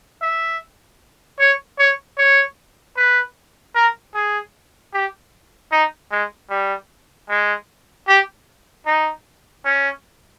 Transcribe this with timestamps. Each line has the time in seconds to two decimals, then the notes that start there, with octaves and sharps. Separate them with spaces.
0.22 E5
1.40 C#5
1.79 C#5
2.18 C#5
2.97 B4
3.75 A#4
4.14 G#4
4.94 G4
5.72 D#4
6.11 G#3
6.50 G3
7.30 G#3
8.08 G4
8.86 D#4
9.65 C#4